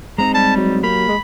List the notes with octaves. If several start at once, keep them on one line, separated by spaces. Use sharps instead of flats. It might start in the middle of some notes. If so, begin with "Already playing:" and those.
G#3 C4 D#4 A#5
G3 A5
F#3
A#3 G4 A#4 B5
G#3